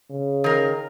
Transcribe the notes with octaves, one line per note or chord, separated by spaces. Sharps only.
C#3
D#3 A#4